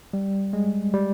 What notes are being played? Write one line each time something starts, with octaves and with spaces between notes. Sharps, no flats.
G3
G#3
G3